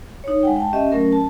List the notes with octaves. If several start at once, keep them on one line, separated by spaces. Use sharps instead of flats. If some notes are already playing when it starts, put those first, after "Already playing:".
D#4 C#5
G#3 F#5 G5
G5 A5
C#4 G4 D#5 E5
F#3 A3 C#4 A#4
A5